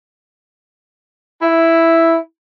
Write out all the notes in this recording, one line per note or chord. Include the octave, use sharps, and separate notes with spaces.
E4